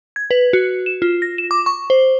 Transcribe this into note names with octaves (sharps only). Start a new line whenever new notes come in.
G#6
B4
F#4
E7
F4
A#6
E7
D6
C#6
C5